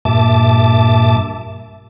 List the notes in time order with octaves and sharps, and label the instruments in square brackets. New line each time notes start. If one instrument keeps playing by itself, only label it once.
[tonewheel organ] G2 A#2 E5 A5 D6